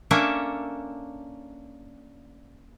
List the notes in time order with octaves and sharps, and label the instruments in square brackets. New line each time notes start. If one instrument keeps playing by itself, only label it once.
[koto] A#3 C#4 D4 A4 C#5 E5